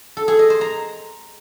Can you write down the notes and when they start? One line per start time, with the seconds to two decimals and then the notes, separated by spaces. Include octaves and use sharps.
0.17 A4
0.28 G#4
0.39 D#5
0.50 C5
0.61 A#5